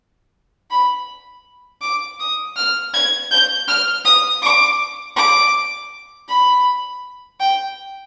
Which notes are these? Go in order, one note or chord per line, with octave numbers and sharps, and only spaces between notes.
B5
D6
D#6
F6
G#6
G6
F6
D#6
D6
D6
B5
G5